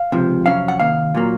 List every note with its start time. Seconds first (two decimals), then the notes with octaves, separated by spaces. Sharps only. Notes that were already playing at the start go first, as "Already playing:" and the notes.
Already playing: F5
0.12 C#2 C3 F3
0.45 F2 C3 F#3 C#4 F5
0.68 F#5
0.80 C3 D#3 A#3 F5
1.15 A#2 F#3 A#3